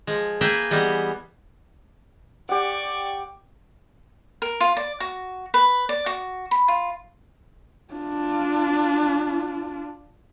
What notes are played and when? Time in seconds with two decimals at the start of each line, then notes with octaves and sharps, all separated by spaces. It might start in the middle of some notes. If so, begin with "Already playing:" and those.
0.07 F3 G#3
0.41 A#3 G#4 B4 E5 G5
0.71 E3 G3 G#3 B3
2.49 G4 D5 F#5 C#6
4.42 A#4
4.60 F4
4.77 D5
5.00 F#4
5.54 B4
5.89 D5
6.06 F#4
6.51 B5
6.68 F4
7.94 D4 F4